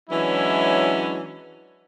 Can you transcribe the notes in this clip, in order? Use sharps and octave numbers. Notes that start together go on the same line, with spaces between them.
E3 F#3 G#3 C#4 D4 E4